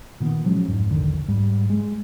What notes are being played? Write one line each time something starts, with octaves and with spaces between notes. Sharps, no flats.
A#2 D#3 B3
F3 F#3 G#3 C#4
D1 F2 G#2
E1 A#1 D3 D#3
G#2 G3
G#3